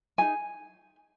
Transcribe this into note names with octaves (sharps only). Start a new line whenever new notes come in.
D#4 G#4 G#5